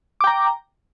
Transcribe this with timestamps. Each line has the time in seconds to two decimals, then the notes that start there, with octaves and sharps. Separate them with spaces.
0.21 D6
0.24 G5
0.27 A#5